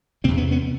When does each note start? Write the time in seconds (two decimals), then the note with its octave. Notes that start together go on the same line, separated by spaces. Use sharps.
0.24 E2 C3 A#3 C4
0.37 B3 C#4
0.51 B3 C#4